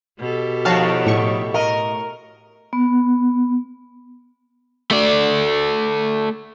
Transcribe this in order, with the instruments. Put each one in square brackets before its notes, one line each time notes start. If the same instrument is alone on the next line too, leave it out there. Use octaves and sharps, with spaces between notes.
[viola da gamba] B2 G4 A4
[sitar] D#3 F3 C#5 [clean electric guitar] F#4 [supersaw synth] F5 A5
[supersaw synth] A2 C#6
[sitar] A#4 [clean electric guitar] D#5
[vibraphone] B3
[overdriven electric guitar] A3 D5